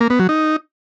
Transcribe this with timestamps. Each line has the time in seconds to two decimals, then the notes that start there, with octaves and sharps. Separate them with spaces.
0.01 A#3
0.10 B3
0.19 F#3
0.29 D#4